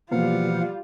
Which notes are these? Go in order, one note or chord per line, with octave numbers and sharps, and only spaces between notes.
B2 E3 F3 G3 A#3 F4 F5 F#5